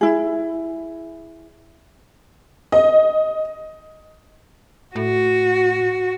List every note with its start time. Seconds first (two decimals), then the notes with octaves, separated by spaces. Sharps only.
0.01 E4 G#4
2.72 D#5
4.96 A2 F#4